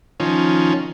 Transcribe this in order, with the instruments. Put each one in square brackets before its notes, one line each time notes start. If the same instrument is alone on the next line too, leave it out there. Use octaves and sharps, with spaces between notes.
[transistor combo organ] D#3 F3 C#4